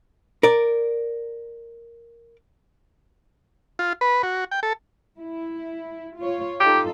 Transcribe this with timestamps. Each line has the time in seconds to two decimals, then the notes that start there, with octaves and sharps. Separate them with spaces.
0.43 A#4 D5
3.79 F4
4.01 B4
4.23 F#4
4.51 G5
4.63 A4
5.20 E4
6.19 F4 C#5
6.60 D#4 F4 G4 A4